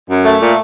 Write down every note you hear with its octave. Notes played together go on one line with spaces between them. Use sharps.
F#2
A3
A#2